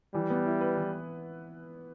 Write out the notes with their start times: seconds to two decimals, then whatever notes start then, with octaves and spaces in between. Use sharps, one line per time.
0.14 E3 G3
0.30 B3
0.46 E4
0.61 B4
0.77 E3